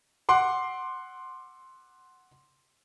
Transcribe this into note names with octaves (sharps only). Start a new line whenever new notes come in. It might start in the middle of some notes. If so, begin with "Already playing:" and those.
F#5 C6 D6